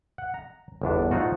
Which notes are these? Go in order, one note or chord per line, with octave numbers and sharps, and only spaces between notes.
F#5
A#5
G1 E2 D4
F3 A3 D#4 F4 F#4